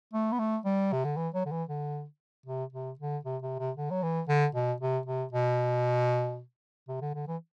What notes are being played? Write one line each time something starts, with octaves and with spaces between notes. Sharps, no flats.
A3
B3
A3
G3
C3
D3
E3
F#3
D3
E3
D3
C3
C3
D3
C3
C3
C3
D3
F#3
E3
D3
B2
C3
C3
B2
C3
D3
D3
E3